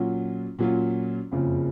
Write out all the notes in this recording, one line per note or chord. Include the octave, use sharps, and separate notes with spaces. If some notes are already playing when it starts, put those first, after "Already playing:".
Already playing: A#2 F#3 C#4 F4
A#2 F#3 C#4 F4
F#1 F2 C#3 F3